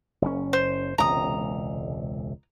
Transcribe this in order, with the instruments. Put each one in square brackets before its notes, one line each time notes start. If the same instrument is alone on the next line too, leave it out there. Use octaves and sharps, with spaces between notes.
[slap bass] F#1 C#4
[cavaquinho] C5
[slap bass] E1 C#2 C3 [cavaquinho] A#5 D#6